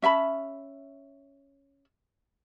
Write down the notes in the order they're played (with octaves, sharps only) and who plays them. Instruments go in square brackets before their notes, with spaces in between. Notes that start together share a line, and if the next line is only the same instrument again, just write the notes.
[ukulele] C#4 E5 A5 B5